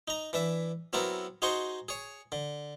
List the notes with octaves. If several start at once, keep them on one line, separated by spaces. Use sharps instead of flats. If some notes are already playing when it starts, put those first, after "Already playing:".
D#4 A#5
E3 D4 E5
F#3 B3 C4 E4 A4 A#4
D#4 F#4 G#4 C5 C6 C#6
G#4 C#5
D3